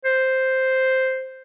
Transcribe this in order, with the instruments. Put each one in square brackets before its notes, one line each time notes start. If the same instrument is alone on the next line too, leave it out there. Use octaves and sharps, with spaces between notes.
[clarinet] C5